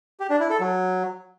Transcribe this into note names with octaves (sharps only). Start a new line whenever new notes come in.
G4
D4
E4
A4
F#3